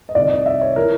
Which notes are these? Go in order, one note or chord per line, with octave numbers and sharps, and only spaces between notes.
D#5
C2 C3 D#3 D5
D#5
E5
C#5
E3 A#4